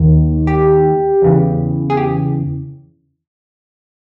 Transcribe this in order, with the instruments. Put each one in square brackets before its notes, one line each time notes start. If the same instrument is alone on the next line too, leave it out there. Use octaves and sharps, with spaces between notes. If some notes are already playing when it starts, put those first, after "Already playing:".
Already playing: [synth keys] D#2 D#3
G4
E2 C#3 E3
G#4
G4